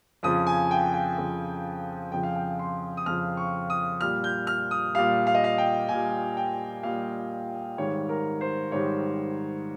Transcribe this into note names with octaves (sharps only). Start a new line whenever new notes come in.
F2 C#3 F3 D#6
G#5
G5
G5
F2 C#3 F3
F2 C#3 F3 G5
F5
G5
C6
D#6
F2 C#3 F3 F6
C#6
D#6
A#2 G3 F6
G6
F6
D#6
A#2 G3 F5
F5
D#5
F5
G5
A#2 G3 G#5
G5
A#2 G3 F5
G#2 D#3 G3 C#5
A#4
C5
G#2 D#3 G3 C#5